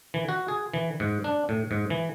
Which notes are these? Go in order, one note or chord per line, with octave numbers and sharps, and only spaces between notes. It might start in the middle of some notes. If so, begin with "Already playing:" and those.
E3
F#4
G#4
E3
G#2
D4
A2
G#2
E3